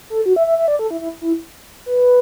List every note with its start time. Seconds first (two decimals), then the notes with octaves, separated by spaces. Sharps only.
0.10 A4
0.26 F#4
0.36 E5
0.47 E5
0.58 E5
0.68 D5
0.79 A4
0.90 E4
1.01 E4
1.21 E4
1.86 B4